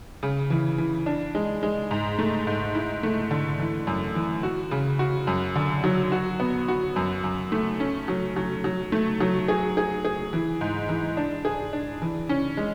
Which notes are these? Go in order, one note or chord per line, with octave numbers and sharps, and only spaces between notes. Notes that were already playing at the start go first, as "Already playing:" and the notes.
C#3
E3
E3
D4
G#3
G#3
G#2
A3
G#2
E4
A3
D3
E3
F#2
E3
F#4
C#3
F#4
F#2
D3
F#3
F#4
B3
F#4
F#2
F#2
A3
C#4
F#3
F#3
F#3
A3
F#3
G#4
G#4
G#4
E3
G#2
E3
D4
G#4
D4
E3
C#4
G#3